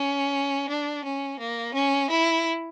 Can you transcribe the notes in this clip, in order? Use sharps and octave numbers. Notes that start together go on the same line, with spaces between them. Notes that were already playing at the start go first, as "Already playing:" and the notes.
Already playing: C#4
D4
C#4
A#3
C#4
E4